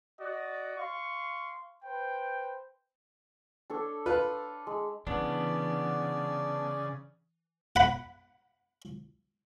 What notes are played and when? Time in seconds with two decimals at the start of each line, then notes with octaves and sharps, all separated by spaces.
0.20 F#4 D5 D#5
0.77 F5 C6 C#6
1.84 B4 C5 G5
3.70 D4 A4 C#5
4.06 F4 B4
4.67 G#3
5.07 C#3 E3 B3 D4 D5
7.76 F#5 B5